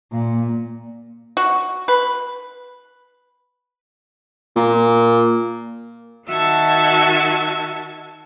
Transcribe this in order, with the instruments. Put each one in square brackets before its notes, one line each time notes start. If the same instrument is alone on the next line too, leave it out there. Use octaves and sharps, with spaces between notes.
[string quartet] A#2
[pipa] F#4
B4
[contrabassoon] A#2
[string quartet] D#3 F#4 E5 A5 G#6